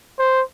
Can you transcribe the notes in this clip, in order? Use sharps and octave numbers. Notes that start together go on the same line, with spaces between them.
C5